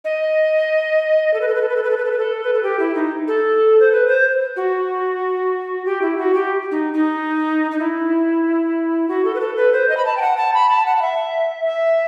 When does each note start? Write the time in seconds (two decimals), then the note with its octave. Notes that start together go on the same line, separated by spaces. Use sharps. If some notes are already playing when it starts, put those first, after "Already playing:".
0.05 D#5
1.34 A4
1.41 B4
1.48 A4
1.55 B4
1.62 A4
1.69 B4
1.76 A4
1.84 B4
1.91 A4
1.97 B4
2.05 A4
2.12 B4
2.18 A4
2.44 B4
2.53 A4
2.63 G4
2.79 E4
2.95 D#4
3.28 A4
3.80 C5
3.92 B4
4.08 C5
4.56 F#4
5.86 G4
6.02 E4
6.18 F#4
6.34 G4
6.71 D#4
6.93 D#4
7.71 D#4
7.79 E4
9.08 F#4
9.25 A4
9.35 B4
9.40 A4
9.57 B4
9.73 C5
9.89 D#5
9.97 B5
10.05 A5
10.17 G5
10.21 F#5
10.37 A5
10.54 B5
10.69 A5
10.86 F#5
10.97 F#5
11.02 E5
11.66 E5